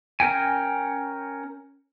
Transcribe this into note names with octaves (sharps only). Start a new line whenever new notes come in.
C#4 A#4 G5 G#5